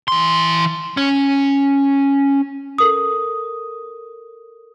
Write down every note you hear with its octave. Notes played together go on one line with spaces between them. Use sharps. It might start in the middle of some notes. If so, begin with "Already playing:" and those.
E3 C6
C#4
A4 A#4 D#6